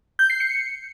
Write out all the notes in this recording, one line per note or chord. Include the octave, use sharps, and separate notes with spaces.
G6
C7
C#7